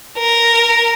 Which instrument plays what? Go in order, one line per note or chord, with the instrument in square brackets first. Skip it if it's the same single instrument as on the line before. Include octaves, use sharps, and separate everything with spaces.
[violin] A#4